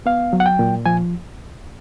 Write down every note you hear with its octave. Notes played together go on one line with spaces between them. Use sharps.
B3 F5
F#3
F#5
G5
A#2
F3 G#5